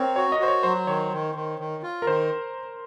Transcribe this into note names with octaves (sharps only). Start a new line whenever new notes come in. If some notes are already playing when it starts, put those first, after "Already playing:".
Already playing: C4 A#4 C#5
F#4 C#5
D#5
F#4 C5
C#5
F#3 C5
D#3 C#5
D#3
D#3
D#3
F4
A#4
D#3 C5